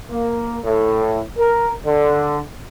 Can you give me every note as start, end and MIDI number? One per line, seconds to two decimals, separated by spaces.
0.10 0.59 58
0.65 1.19 45
1.37 1.70 70
1.84 2.39 50